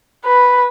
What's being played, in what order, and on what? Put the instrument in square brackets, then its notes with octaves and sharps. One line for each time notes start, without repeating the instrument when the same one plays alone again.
[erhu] B4